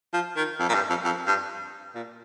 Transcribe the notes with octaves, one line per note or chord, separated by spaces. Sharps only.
F3
D#3
F2
A#2
G2
F2
F2
G2
A#2